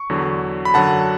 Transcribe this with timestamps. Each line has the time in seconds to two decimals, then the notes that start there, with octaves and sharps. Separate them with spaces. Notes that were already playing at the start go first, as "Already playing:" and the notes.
Already playing: C#6
0.10 E2 D3 F#3
0.65 B5
0.74 F#2 D3 F#3 F#5 A5